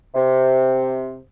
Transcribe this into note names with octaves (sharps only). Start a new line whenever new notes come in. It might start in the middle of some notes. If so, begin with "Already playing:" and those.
C3